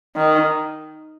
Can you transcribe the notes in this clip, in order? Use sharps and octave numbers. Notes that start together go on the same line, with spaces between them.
D#3